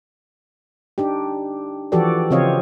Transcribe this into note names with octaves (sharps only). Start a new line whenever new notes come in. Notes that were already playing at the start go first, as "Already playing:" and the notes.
D4 D#4 G4
E3 F3 F#4 G4 A4 D5
C#3 F3 C4 C#5 D#5 F5